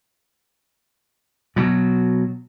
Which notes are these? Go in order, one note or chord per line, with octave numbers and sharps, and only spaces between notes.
B2 F#3